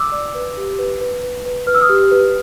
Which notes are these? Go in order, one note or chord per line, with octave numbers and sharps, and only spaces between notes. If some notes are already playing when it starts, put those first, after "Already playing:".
Already playing: D6 E6
D5
B4
G4
B4
B4
B4
B4
B4 F6
E6
D#6 F6
G4
B4